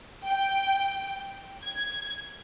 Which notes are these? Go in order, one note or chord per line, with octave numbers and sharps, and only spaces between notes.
G5
G#6